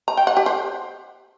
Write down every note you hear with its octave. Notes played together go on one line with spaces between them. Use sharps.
A#5
G5
F#5
G4
C5